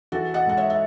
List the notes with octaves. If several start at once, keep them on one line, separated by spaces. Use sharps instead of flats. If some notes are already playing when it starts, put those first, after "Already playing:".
E3 F#4 A4
D#5 F#5
G#2 F#5
C#5 E5
E5